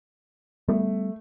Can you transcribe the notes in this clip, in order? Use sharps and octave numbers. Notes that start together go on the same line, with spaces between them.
G3 A3 B3